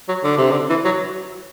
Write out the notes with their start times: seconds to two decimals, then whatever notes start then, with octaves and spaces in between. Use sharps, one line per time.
0.09 F#3
0.24 D3
0.38 C3
0.51 D3
0.70 E3
0.85 F#3